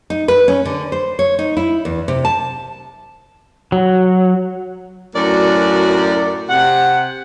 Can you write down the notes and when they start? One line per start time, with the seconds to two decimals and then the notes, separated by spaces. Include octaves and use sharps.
0.10 D#4
0.28 B4
0.48 C#4
0.65 D3
0.92 C5
1.19 C#5
1.39 D#4
1.57 E4
1.85 E2
2.08 C3
2.25 A5
3.72 F#3
5.15 F#2 A2 F#4 A#4 D5
6.49 C3 F#5